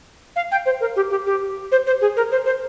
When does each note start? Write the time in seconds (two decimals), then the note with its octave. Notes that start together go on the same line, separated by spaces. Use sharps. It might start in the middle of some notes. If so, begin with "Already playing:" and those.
0.36 F5
0.51 G5
0.66 C5
0.80 A#4
0.96 G4
1.10 G4
1.27 G4
1.72 C5
1.87 C5
2.01 G#4
2.17 A#4
2.32 C5
2.46 C5